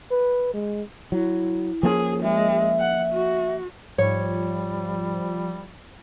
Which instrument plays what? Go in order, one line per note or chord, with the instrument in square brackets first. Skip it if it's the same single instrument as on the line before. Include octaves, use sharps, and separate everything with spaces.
[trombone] B4
G#3
[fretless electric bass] F#3 [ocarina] E4
[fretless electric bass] F3 A#3 C#4 [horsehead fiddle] G#4
[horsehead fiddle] G#3 [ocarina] E5
[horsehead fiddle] F#5
F#4
[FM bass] G#2 [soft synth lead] F3 [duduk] G3 [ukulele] C#5